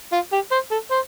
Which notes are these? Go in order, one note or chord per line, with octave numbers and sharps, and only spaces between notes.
F4
G4
C5
A4
C5